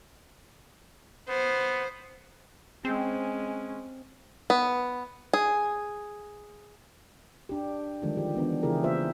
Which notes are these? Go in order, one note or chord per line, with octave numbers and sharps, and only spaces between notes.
B3 C5
G#3 C4 C#4
B3
G#4
D4 G4
D3 D#3 F3 G3 G#3
F3 G4
E3 B3 D4
C#3 E3 E4 G4 G#4 A#4
A#3 F4 C5 E5